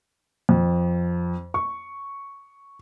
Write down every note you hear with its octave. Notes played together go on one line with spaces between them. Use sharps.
F2
C#6